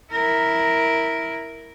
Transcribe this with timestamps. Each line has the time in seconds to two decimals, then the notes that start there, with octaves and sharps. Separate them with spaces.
0.12 E4 A#4